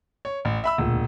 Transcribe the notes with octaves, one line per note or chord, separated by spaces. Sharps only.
C#5
A1
E5 B5 E6
E1 D2 A#2